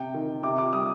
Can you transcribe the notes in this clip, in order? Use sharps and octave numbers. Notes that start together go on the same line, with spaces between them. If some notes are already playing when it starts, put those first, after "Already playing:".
Already playing: C3 G5
D#3
C3 D6
D6
G3 D#6